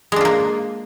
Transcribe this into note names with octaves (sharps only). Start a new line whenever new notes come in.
G#3 A#3 D4 F4